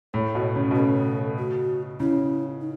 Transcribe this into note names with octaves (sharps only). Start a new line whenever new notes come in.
A2 C#5
B2
C#3
B2
C#3 A4 B4
F#4
C#3 E4
D#4